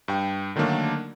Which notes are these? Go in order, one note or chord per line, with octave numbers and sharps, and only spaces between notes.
G2 G5
D3 D#3 F#3 A3 A#3 D4